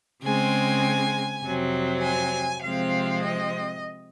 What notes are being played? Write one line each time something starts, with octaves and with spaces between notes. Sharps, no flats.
C#3 G#3 C4 G#5
F2 C3 F#3 C4
G#5
C3 F3 G#3 C4 F5
D#5